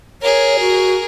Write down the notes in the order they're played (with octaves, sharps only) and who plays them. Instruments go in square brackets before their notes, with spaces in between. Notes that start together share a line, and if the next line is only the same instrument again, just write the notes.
[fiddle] G#4 A#4 [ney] C#5
[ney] F#4